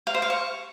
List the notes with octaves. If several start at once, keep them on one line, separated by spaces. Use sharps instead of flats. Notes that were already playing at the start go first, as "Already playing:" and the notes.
F5
C5
F5
C#6